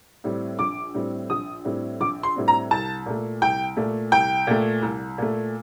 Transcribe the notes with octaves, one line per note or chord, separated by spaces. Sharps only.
A2 G3 C4
A#1 D6
A2 G3 C4
A#1 D#6
A2 G3 C4
A#1 D6
C6
A2 G3 C4
A#5
C2 A5
A#2 A3
C2 G5
A#2 A3
C2 G5
A#2 A3
C2
A#2 A3